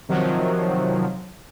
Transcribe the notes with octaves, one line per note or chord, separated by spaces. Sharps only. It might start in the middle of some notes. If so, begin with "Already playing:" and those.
C3 D#3 F3 F#3